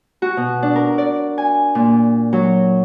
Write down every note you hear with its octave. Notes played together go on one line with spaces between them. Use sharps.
F#4
B2
D4
A#4
D5
G#5
A#2
F#3